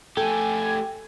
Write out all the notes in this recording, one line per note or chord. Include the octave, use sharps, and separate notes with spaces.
A3 G4 A4 G5 G#5